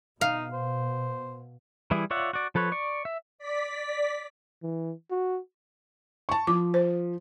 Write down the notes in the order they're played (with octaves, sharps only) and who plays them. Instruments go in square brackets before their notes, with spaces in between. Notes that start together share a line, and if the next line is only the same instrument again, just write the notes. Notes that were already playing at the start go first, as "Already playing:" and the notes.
[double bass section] B2 [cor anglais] D#4 [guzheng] F5
[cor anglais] C5
[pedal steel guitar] E3 G3 E4 G#4
F4 C#5 D5 E5 F#5
F#4 D5
F3 A4 B4 C#5
D5 C#6
E5
[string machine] D5 B6
[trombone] E3
F#4
[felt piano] A5 C#6
[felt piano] F3 [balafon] D6
[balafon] C5